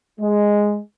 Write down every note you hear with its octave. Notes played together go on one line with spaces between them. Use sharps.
G#3